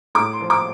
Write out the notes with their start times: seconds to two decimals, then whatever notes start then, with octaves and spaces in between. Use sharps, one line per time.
0.15 A2 D6
0.33 C6
0.41 F3
0.50 D6